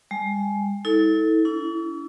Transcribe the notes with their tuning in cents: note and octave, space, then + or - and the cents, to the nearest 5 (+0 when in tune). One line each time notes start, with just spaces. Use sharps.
G3 +45 G#5 +35
E4 -40 A4 +0
C#4 +45 E4 +10